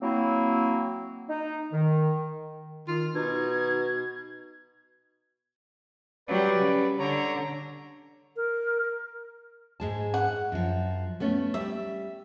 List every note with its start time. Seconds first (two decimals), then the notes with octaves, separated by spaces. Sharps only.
0.02 F#3 A#3 C4 E4
1.28 D#4
1.73 D#3
2.88 D#3 F4
3.15 B2 D#4 G#6
6.28 F#3 G3 B4 D5
6.59 C#3
6.99 D3 C#5 A#5
8.36 A#4
9.80 G#2 G#3 A5
10.14 F#5
10.52 F#2 F3
11.20 A3 B3 C#4
11.54 G3 E5